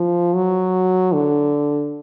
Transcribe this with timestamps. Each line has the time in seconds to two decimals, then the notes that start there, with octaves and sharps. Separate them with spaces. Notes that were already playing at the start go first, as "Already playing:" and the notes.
Already playing: F3
0.34 F#3
1.14 D3